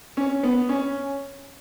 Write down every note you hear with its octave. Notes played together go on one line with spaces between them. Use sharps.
C#4
B3
C#4